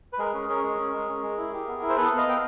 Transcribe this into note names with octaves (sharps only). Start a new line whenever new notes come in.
B4
G#3 G#4 A#4
C#4
C#4 G#4 A#4
G#3
C#4
G#3
C#4
G#3
E4
G4
B3
E4
C5
B3 A4 B4
B3
D#5 F5
B3 G5